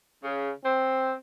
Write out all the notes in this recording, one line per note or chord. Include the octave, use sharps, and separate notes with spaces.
C#3
C4